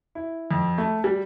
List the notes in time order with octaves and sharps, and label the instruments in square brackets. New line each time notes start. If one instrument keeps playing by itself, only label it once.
[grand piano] E4
F2
A3
G3